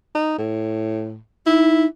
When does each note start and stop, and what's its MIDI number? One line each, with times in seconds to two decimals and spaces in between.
0.15 0.38 63
0.38 1.18 45
1.46 1.85 63
1.46 1.85 64